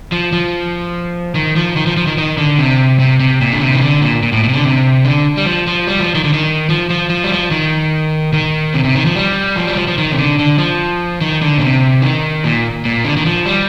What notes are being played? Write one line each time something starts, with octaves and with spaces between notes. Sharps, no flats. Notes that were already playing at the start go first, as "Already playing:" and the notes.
F3
F3
D#3
F3
D#3
F3
F3
D#3
D#3
D3
C3
C3
C3
A#2
D3
C3
D#3
D3
A#2
A#2
A2
A#2
C3
D3
C3
D3
G3
F3
F3
G3
F3
D#3
D3
D#3
F3
F3
F3
G3
F3
D#3
D#3
C3
C3
D#3
F3
G3
F3
G3
F3
F3
D#3
C3
D3
D3
F3
D#3
D3
A#2
C3
D#3
A#2
A#2
D3
D#3
F3
G3